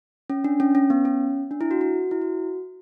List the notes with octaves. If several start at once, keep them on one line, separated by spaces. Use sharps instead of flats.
C#4
D4
C#4
C#4
B3
C#4
D4
E4
F#4
F#4
E4
F#4